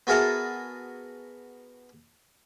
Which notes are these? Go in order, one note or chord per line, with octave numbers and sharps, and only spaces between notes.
B3 F#4 G#4 A#4 E5 A5